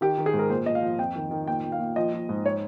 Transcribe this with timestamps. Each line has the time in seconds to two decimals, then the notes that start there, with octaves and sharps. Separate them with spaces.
0.01 D#3 G4
0.18 D#3
0.26 G#4
0.34 G#2
0.39 A#4
0.50 A#2 C5
0.66 A#2 D#5
0.75 F5
0.82 F3
0.99 F2 G5
1.16 D#3
1.31 D#3
1.48 A#2 G5
1.64 A#2
1.72 F5
1.79 A#2
1.96 F3 D#5
2.12 F3
2.29 G#2
2.46 C#5